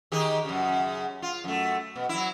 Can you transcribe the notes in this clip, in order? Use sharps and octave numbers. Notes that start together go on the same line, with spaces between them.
D#3 G4 G#4
F#2 C#3
F4
F#2 A3
B2
F#3 E4